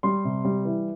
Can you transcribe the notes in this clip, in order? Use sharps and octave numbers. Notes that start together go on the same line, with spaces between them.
G3 C6
C3
G3
E3